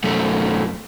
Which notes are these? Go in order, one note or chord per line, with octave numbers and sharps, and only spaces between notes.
F#2 A3